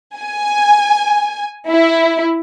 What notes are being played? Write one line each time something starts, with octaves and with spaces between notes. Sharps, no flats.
G#5
E4